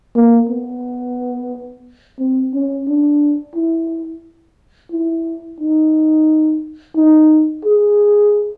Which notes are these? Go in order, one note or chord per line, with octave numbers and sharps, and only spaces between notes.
A#3
B3
C4
C#4
D4
E4
E4
D#4
D#4
G#4